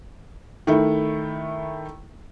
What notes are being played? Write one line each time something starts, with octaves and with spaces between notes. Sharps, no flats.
D#3 A3 E4